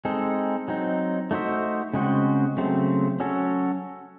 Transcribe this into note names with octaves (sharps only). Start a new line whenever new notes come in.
G#3 C4 D#4 A4
F#3 C4 D#4
A3 D#4 F#4 C5 E5
C#3 G#3 C4 F#4
C#3 F#3 A3 C4
F#3 C#4 F#4 A4